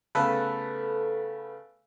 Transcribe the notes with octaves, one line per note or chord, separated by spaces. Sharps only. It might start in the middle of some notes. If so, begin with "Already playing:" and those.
C#3 A3 B3 A4 B4